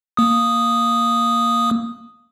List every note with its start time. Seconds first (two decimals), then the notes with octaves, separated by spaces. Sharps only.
0.17 A#3 D#6